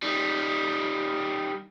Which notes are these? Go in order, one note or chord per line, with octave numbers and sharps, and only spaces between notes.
D#3 G3